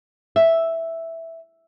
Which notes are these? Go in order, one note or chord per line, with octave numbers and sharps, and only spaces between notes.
E5